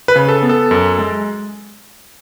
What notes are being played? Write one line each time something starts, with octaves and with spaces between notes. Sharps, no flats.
B4
C#3
A4
B3
A4
F#2
G#3